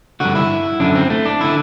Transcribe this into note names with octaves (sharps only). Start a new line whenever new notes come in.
G2 D3 F#4
E4
F#2 D3 D4
C4
A3
D4
D3 E4